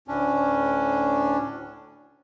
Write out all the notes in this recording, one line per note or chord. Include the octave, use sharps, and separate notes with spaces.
D2 A2 C#4 D4